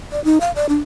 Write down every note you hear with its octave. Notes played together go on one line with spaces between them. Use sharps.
D5
D#4
F5
D5
D4